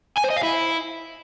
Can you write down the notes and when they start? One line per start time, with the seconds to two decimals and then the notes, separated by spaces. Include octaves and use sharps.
0.18 G#5
0.24 C5
0.31 D#5
0.37 F5
0.43 E4